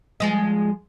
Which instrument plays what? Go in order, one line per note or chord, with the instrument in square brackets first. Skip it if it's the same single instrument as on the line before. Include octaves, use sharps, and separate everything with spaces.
[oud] F3 G#3 D#5